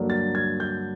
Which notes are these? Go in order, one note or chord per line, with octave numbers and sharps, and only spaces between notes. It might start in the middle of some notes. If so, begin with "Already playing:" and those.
Already playing: G2 D3 F#3 A#3 D4
A6
G#6
G6